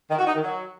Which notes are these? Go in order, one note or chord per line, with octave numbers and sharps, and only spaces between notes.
D#3
F#4
D#4
D#3
F#3